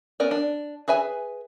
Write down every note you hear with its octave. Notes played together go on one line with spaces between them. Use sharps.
B3 C#4 A#4 D5
D4
G#4 B4 E5 G#5